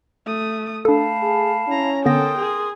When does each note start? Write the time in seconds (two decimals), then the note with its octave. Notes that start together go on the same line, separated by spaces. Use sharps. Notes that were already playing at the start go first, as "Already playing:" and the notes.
0.26 A3 D#6
0.85 A3 D4 A4 F5 A5 B5
1.23 G#4
1.69 C#4 E4 A#5
2.06 D3 B3 A4 A#4 G5 C6 D#6 A#6
2.38 G#4